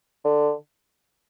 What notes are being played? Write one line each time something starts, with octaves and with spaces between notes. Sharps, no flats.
D3